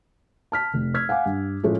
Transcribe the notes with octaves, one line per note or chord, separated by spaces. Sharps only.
A5 F6 B6
F1
E6 F6 G#6 B6
F5 F#5 G#5 D6
G2
A2 F3 G#3 A3 C#4 F4